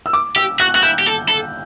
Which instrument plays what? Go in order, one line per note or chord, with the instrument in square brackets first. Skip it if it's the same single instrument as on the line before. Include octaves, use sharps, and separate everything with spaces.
[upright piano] E6
D6
[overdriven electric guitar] G4 [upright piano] E6
[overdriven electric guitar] F#4 [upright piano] F#6
[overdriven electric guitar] F#4 [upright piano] F#6
[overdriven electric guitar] E4 [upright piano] G6
[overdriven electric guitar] G4
A4
A4